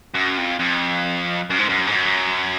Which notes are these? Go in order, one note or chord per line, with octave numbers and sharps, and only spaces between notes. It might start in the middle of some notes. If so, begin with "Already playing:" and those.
F#2
F2
F2
F#2
G#2
F#2
G#2
F#2